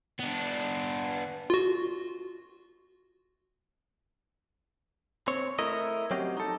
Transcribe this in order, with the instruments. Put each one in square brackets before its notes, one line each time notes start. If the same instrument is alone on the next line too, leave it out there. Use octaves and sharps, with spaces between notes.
[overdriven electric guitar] B3 D4
[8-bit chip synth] F4 F#4
[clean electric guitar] C4 C#5
A3 E4 A#4 D#5
F#3 C4 C#4 G4 D#5
D#4 A4